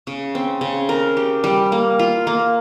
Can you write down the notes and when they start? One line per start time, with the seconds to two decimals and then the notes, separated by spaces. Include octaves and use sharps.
0.07 C#3
0.35 C4
0.61 C#3
0.89 A#4
1.17 G4
1.44 G3
1.72 A#3
1.99 F4
2.27 A#3